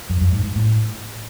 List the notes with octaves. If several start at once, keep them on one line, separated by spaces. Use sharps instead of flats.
F#2
F#2
G#2
G#2
A2